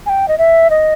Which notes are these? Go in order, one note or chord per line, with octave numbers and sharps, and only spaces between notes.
G#5
G5
D#5
E5
D#5